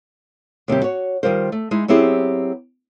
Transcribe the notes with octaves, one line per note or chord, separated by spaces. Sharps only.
D#2 C3 G3 G4
F#4 C#5
D#3 E3 G3 F4 A#4 C5
A3
G#3 D#4 E4
F#3 B3 C4 E4 G4 G#4